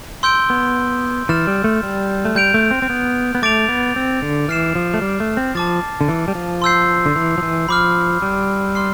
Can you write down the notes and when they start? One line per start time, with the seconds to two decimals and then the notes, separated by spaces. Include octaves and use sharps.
0.23 C6 E6 G6 D7 G7
0.50 B3
1.29 E3 F6 A6 E7
1.47 G3
1.64 A3
1.83 G3
2.25 A3
2.35 G3 G6 D7 F7
2.54 A3
2.71 C4
2.82 C4
2.90 B3
3.35 B3
3.42 A3 D6 A6 D7 F7
3.69 B3
3.96 C4
4.22 D3
4.48 E3 F6 C7 E7
4.75 F3
4.94 A3
5.02 G3
5.20 A3
5.37 C4
5.55 F3 A5 D6 A6
6.01 D3
6.08 E3
6.28 G3
6.35 F3
6.62 C6 E6 G6 C7
7.06 D3
7.16 E3
7.38 F3
7.42 E3
7.69 F3 B5 D6 F6
8.22 G3
8.75 C6 F6 C7